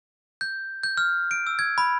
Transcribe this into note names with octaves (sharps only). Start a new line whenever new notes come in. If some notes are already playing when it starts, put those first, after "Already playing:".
G6
G6
F6
D7
E6
G#6
B5